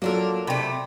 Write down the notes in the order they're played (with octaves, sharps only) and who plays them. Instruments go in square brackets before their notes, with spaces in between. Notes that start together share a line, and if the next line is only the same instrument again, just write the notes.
[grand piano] F#3 F4 A4 [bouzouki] A#3 D4 A#4
[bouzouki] C3 A3 [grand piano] D5 G5 B5